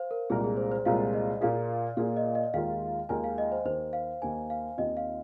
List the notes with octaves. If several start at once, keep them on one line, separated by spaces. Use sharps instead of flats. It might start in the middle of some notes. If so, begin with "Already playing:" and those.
Already playing: C5 F5
A#4
C2 A#2 G#3 F4 G#4 A#4
G#4
C5
C5
C2 A#2 G#3 F4 A#4 F5
D#5
A#2 A#3 F4 G#4 F5
A#2 A#3 F4 G#4 F5
D#5
D#5
D#2 D#3 G#3 F4 A#4 F5
D#2 D#3 G#3 F4 A#4 G#5
F5
D#5
C5
D#2 D#3 A#3 C5
F5
D#2 D#3 A#3 G#5
F5
D#2 D#3 C4 F4 D#5
F5